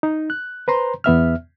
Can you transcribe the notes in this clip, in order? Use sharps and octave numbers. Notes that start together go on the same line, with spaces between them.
D#4
F#6
B4 C5 A#5 C6
E2 B3 E5 F6